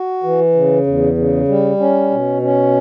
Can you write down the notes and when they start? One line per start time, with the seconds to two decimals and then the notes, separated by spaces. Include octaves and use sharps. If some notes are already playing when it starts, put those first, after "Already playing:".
Already playing: F#4
0.23 E3
0.55 C#3
0.87 E2
1.17 C#3
1.48 G3
1.79 C#4
2.11 B2
2.42 C#4